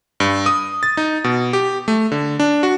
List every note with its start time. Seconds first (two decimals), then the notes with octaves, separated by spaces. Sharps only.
0.20 G2
0.46 D#6
0.83 A6
0.97 D#4
1.24 B2
1.53 G4
1.88 A3
2.12 D3
2.40 D4
2.63 F#4